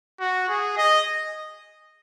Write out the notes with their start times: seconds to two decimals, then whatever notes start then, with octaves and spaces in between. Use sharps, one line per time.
0.20 F#4
0.49 G#4
0.77 D#5